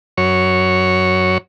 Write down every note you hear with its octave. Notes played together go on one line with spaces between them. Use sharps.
F#2 C#5